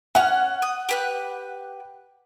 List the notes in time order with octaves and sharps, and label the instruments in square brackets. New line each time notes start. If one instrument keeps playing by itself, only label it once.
[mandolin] C#4 F6 [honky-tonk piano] F#5
[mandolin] D#6
G4 B4 F#6